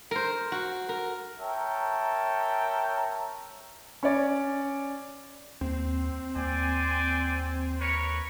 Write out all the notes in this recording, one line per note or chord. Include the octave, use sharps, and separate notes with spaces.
A#4 C5
F#4
A#4
A#4 C#5 E5 G5 A5 A#5
C#4 C#5 D5
D#2 C4
D#2 C5 D5 G#5
A#4 B4 C#5